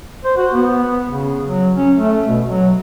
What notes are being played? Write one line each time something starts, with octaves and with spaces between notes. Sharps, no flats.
C5
F#4
B3
C#3
F#3
C#4
A3
B2
F#3